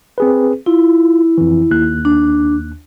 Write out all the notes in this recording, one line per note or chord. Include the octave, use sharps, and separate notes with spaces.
C4 G#4 B4
E4 F4
F2 E3
D#2 F#6
D4